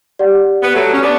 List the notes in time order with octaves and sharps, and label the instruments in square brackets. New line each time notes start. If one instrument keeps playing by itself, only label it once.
[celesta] G4 D5 F#5
[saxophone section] B3
F#3 A3
C#4
B3 D4